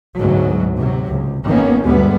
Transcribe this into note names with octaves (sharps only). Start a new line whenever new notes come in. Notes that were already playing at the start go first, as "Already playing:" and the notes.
D2 G#2 B2 F#3
C3 F#3
C#2
G#1 D#3 A#3 B3 C#4
D2 G2 G3 G#3 B3